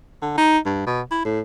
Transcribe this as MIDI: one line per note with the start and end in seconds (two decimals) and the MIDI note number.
0.22 0.35 50
0.38 0.58 63
0.65 0.84 43
0.86 1.01 47
1.11 1.24 64
1.25 1.40 45